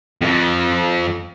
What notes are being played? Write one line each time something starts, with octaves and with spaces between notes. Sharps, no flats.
F2 F3